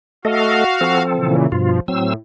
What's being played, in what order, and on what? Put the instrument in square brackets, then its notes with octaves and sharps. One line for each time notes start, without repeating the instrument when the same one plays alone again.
[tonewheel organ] A3 A4 D#5 [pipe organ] F#4 F5
[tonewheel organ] F3 C4 A4
[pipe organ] A#2 C#3 E3
[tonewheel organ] G2 B2 F4 [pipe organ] F3
[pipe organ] A2 [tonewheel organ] F#3 C4 E6